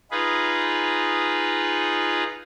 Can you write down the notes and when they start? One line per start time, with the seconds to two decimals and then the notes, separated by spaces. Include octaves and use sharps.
0.11 D#4 F4 G#4 B4